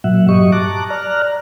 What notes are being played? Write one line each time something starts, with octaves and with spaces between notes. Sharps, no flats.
A#2 F#3 E5 F#5
G2 F#3 G4 D#5 C#6
A5 A#5 D6 F#6
D5 A#5 F6 F#6